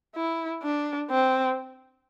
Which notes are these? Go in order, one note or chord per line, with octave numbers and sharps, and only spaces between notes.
E4
D4
C4